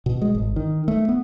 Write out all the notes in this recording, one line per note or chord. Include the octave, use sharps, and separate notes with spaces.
B2
G#3
G#1
D#3
A3
B3